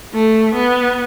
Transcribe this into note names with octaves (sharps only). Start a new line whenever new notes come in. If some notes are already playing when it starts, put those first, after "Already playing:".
A3
B3